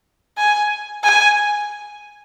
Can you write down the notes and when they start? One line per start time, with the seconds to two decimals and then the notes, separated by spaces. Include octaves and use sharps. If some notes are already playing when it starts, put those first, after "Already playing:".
0.38 G#5
1.04 G#5